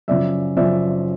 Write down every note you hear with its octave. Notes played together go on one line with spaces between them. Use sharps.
F#2 C#3 F3 D5 E5
F#2 C#3 F3 D5 E5